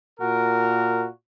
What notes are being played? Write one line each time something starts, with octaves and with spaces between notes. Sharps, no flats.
A#2 F#4 A#4